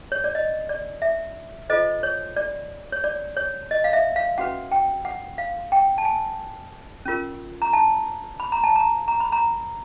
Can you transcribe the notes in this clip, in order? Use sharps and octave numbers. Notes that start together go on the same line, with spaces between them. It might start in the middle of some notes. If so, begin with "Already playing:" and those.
C#5
D5
D#5
D5
E5
F4 A4 C5 D#5
C#5
D5
C#5
D5
C#5
D#5
F5
E5
F5
C#4 F#4 B4 F#5
G5
F#5
F5
G5
A5
G#5
C#4 F4 A#4
A#5
A5
B5
A#5
A5
A#5
A#5
B5
A#5